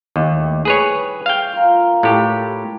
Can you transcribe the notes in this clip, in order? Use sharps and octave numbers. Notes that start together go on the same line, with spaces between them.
D#2 A2 G3 G4
G#4 B4 C#5
F5 G5
F4 A#4
A2 G4